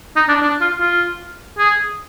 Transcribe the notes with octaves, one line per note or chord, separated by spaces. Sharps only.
D#4
D4
D4
F4
F4
G#4